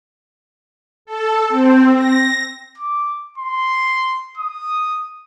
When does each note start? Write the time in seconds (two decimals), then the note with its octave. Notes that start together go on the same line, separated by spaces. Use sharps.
1.05 A4
1.48 C4
1.95 A#6
2.78 D6
3.38 C6
4.38 D#6